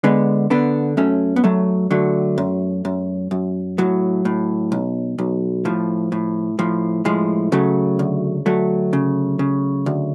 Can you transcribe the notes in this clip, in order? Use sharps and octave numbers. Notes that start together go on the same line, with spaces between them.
D3 G#3 B3
D3 B3 D4
F#2 A3 C#4
B3
F#2 F#3 A3
D3 F#3 A3
F#2
F#2
F#2
A2 F#3
A2
B1
B1
A2 F3
A2
A2 F3
A2 F3 G#3
C#3 F#3 A3
D2
D2 F#3 A3
C#3
C#3
D2